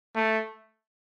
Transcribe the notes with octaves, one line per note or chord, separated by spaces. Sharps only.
A3